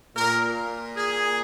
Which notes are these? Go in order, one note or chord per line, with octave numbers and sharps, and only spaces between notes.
A#2 A#4
G#4